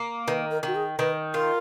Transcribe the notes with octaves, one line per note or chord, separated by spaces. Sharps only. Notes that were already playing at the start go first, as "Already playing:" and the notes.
Already playing: A#3
D#3 B4
A#4
D#3 F#4
G#4
D#3 B4
F4 A#4